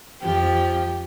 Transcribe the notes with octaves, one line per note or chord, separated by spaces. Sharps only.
F2 F3 G4